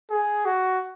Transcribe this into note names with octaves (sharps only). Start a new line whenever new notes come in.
G#4
F#4